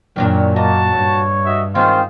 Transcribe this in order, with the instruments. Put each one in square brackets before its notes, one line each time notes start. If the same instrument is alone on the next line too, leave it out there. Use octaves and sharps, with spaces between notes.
[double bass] F#2 A#2 [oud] D#3 F#3 D4
[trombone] A#3 [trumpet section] F#4 A5 [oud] D#5
[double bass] G2 [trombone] C#5
[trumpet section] F#4 D#5 E5
[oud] D#3 C4 [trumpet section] G#3 D#4 C5 [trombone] F4